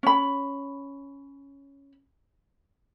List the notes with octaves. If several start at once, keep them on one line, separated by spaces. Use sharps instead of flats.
C#4 B5